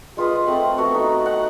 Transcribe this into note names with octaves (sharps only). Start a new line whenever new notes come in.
G#3 F4 B4 D#6
A3 C4 F#5
A3 B3 F#4
D#4
F#5